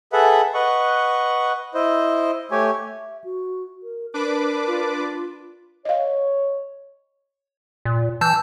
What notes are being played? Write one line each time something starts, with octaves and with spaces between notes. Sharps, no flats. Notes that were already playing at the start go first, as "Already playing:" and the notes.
G#4 A4 B4 E5 F#5
B4 D#5 F#5 C#6
E4 C5 D#5
A3 G4 C#5 G#5
E5
F#4
A#4
D4 A#4 B4 D6
F4
C#5 D#5 F5
A#2
E3 A5 E6 G6